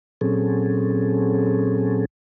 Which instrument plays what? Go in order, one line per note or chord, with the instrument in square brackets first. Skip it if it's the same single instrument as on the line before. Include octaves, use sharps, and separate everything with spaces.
[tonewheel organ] A#2 F#3 C4 C#4 G#4 A4